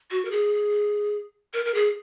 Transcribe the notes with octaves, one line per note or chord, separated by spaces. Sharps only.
F#4
A#4
G#4
A#4
A#4
G#4